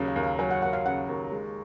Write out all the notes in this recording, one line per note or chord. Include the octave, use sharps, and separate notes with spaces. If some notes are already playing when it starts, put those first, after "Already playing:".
Already playing: D#2 C#3 F#3
F5
D#2
F5
F#3 G#5
F#5
D#2 F#5
F5
C#3 F#5
D#2
G#3